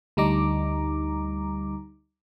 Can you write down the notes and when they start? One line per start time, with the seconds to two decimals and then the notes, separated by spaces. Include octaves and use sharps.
0.17 D2 G3 D#4 A#5 D6